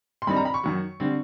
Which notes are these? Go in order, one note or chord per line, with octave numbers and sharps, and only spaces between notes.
C6
G2 D#3 G3 C4 D#4 B5
A#5
B5
C#6
F#2 D#3 F#3
D3 G3 C4